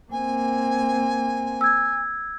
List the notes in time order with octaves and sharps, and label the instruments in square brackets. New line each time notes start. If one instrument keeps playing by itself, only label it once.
[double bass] A#3 C4 [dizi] G#5
[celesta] E6 G#6